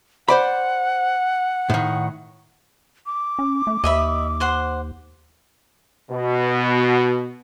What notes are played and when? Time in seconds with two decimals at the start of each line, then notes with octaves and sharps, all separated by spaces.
0.28 C5 D5 F#5 B5
1.70 A2 D#3
3.06 D6
3.39 C#4
3.67 A3
3.84 D#2 D#5 E5 B5
4.40 C5 F#5 C6
6.11 B2